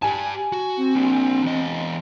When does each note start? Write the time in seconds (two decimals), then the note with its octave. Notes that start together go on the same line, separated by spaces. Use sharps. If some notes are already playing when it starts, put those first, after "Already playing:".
0.02 G4 G#5 A5
0.52 F#4
0.77 C4
0.95 A#3 D4
1.44 E2 D#5